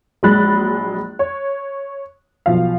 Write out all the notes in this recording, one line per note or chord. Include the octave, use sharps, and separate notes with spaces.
A#1 F#3 G#3 B5 F#6 A6
C#5
B1 B2 F3 F5